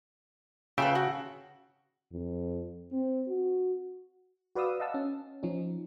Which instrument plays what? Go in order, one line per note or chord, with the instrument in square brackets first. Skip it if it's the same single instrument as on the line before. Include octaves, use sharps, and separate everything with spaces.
[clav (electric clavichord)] C#3 E5 G5 [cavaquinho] F4 A4 B4
[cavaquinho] F#4
[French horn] F2
C4
F#4
[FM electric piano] F#4 B4 D5 F5 D#6 E6
D#5 F5 F#5 A5 E6
C#4
F3 C#4 D#4